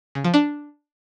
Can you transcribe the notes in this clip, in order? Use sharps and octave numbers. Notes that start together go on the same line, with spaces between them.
C#3
F3
D4